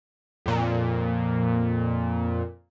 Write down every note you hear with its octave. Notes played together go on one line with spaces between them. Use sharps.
F2 A#2